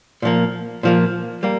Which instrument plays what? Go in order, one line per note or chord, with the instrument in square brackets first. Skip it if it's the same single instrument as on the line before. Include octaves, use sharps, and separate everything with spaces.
[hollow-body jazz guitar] A#2 F3 A#3
A#2 F3 A#3
G3 A#3